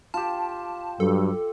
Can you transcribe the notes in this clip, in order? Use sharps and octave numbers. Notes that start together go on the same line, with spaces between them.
F4 G4 A5
G2 F#3 A4